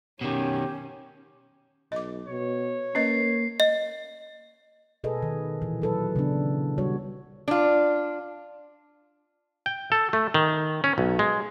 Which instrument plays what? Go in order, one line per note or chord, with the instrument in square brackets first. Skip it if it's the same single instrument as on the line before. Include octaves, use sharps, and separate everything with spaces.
[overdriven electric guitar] B2 D#3 [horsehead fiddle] C#4 [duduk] G4
[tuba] B1 [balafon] D#5 D6
[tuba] B2 [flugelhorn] C#5
[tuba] A#3 [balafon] C#4 B4 D#5 [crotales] C7
[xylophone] D#5
[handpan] B2 G#4 A4 B4 D#5
D#3
A#2 E3
F#3 A4 B4
C#3 B3 D4
G3 F#4 C#5
[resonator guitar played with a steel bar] D4 F4
[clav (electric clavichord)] G5
A4
A3
D#3
C#4
B1
G#3